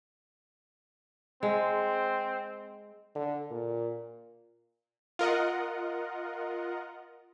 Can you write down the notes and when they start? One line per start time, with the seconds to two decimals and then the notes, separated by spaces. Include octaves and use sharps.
1.43 G#3 C4
3.15 D3
3.51 A#2
5.19 F4 A#4 D#5 F#5